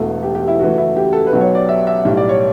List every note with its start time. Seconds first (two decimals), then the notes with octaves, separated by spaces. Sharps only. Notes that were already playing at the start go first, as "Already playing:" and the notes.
Already playing: E1 E2 B2 A3 A4
0.23 G4
0.35 G4
0.48 E4
0.59 F#2 C#3 E3 A3 F#4
0.78 E4
0.96 G4
1.13 A4
1.27 B4
1.32 B1 B2 F#3
1.41 C#5
1.55 D5
1.69 E5
1.87 E5
2.05 B1 A2 G3
2.17 D5
2.29 C#5